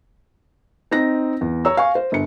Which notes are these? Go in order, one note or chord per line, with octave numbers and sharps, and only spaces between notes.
C4 D#4 D#5 A#6
E2
C#5 A#5 E6
F5 G#5 C#6
C5
G1 C#7